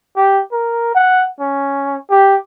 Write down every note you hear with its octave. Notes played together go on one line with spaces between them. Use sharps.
G4
A#4
F#5
C#4
G4